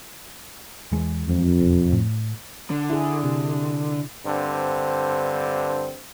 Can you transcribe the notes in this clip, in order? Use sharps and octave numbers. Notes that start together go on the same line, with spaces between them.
E2 E3 G#3
F2
E1
A2
D3
E4 G#4
C3
G2 D3 C4 C5